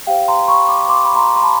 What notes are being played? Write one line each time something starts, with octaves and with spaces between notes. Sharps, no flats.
G4 C5 F5 G5
A#5 C6
B5 C#6
C6 D6
C6 D6
B5
A#5 C6
C6
A5 B5